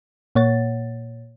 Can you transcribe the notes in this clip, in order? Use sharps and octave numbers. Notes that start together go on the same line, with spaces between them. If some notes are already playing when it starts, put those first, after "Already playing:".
A#2 A#3 C#5 F#5 A6